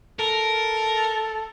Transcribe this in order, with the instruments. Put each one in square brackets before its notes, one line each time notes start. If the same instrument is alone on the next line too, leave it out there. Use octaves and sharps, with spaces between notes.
[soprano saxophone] A4 [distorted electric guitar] A#4